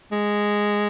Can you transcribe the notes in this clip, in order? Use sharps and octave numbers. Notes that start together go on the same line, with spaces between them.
G#3